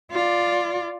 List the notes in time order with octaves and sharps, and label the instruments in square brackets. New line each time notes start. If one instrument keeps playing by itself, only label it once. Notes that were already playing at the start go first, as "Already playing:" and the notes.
[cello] F4 D5